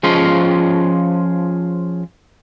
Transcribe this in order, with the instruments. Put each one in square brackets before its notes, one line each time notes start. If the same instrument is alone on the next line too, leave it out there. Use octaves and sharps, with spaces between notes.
[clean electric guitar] F3 C#4 F4 G#4 C5 D#5